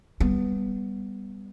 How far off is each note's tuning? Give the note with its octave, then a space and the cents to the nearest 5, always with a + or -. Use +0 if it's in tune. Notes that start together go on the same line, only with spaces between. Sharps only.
G3 +10 B3 +0